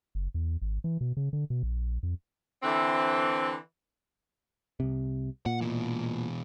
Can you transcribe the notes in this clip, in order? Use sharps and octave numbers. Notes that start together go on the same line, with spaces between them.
F#1
E2
G#1
E3
B2
C#3
D3
B2
A#1
F2
D3 E3 C4
C2 C3
A#2 F#5
B2 E3